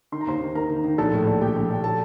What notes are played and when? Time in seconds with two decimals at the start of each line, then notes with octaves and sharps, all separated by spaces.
0.12 D#3 C6
0.21 A#5
0.27 D#2 C5 C6
0.41 D#3
0.55 D#3 A#4 A#5
0.70 D#3
0.84 D#3
0.98 A#1 A4 A5
1.12 A2
1.27 A#1
1.41 A#1 G4 G5
1.56 A#1
1.70 A#1 G5
1.84 A4 A5